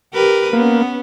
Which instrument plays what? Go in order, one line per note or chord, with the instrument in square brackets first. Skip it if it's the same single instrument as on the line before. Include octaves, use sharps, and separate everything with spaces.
[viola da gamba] G4 A#4 B4
[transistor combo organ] A#3 [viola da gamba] B3 C#4